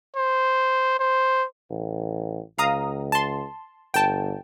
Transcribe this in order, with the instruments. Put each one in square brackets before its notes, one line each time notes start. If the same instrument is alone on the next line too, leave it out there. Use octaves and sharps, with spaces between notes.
[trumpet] C5
C5
[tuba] A1
[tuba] C#2 [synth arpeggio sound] F5 A#5 D#6
[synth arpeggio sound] A5 C6
[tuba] G1 [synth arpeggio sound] G5 A5